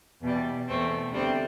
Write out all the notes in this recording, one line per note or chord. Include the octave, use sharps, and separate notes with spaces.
E2 B2 G3
E2 B2 A3 C4
D2 C3 G3 C4